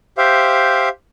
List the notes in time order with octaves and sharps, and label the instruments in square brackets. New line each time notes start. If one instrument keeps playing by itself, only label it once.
[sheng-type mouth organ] G4 C5 E5 F5